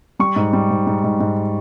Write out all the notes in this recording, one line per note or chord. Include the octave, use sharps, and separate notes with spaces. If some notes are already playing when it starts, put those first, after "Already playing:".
G3 C#6
G#2
G3
G#2
G#2
G#2
G#2